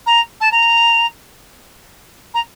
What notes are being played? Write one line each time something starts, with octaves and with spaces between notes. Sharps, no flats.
A#5
A5
A#5
A#5